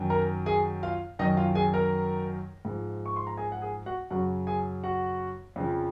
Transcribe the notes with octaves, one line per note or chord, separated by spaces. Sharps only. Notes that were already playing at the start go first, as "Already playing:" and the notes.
Already playing: F#2 D#3 F#3
A#4 A#5
G#4 G#5
F4 F5
F#2 D#3 F#3 D#4 D#5
F4 F5
G#4 G#5
A#4 A#5
G#2 F3
C#6
C6
A#5
G#4 G#5
F#5
G#4 G#5
F#4 F#5
F#2 C#3 F#3 F#4 F#5
G#4 G#5
F#4 F#5
F2 C#3 F3